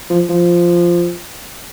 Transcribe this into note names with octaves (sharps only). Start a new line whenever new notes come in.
F3
F3